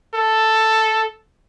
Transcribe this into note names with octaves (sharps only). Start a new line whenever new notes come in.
A4